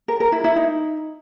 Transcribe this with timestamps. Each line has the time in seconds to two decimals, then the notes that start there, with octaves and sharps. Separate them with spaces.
0.08 A#4
0.20 A#4
0.32 E4
0.44 E4
0.56 D#4